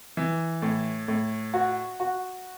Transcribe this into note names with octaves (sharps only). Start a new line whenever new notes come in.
E3
A2
A2
F#4
F#4